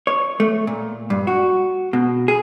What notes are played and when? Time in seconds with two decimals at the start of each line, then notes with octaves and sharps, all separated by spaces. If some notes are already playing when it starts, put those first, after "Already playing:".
0.07 C#5
0.40 A3
0.67 A#2
1.10 G2
1.27 F#4
1.93 B2
2.28 G#4